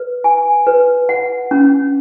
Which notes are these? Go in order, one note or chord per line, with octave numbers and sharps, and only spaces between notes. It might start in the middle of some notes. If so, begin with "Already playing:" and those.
Already playing: B4
G#5
B4
F#5
C#4